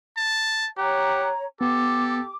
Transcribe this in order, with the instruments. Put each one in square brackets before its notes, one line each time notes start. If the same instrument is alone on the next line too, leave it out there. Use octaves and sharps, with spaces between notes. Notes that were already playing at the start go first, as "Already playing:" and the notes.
[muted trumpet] A5
[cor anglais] G4 [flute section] C#5 A#5 [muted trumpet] F#5
[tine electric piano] B3 [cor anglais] G4 [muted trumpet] A4 [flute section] D6